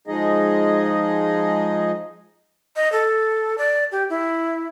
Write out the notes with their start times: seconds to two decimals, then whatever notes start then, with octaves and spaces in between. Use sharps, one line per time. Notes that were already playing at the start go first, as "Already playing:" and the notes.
0.07 F3 G#3 D#4 G#4 D#5
2.76 D#5
2.92 A4
3.58 D5
3.92 G4
4.10 E4